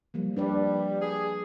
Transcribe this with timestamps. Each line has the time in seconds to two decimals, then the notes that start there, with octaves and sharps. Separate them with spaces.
0.14 F3 G3 A#3
0.37 G3 D4 B4 D5
1.01 G#4